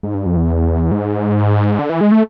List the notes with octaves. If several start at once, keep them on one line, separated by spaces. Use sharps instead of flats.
G#2
G2
F2
E2
G#2
D3
E3
G#3
A3